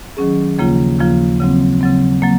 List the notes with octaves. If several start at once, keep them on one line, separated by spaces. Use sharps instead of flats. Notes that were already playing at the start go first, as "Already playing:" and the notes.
D#3 F#3 C#4 G#4
D#2 C#3 F3 A#3 F4
D#2 C#3 F3 A#3 F4
C#3 F#3 C4
C#3 F#3 C4
F#3 A#3